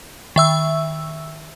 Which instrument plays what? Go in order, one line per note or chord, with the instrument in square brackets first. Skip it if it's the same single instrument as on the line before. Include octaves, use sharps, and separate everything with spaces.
[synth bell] D#3 E5 E6